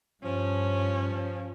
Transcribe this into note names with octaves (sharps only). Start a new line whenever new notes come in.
G2 F3 C#4